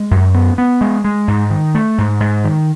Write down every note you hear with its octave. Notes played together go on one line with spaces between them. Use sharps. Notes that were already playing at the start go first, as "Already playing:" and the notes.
Already playing: G#3
F#2
B3
B3
G#3
G#3
G#2
D#3
A3
G#2
G#2
D#3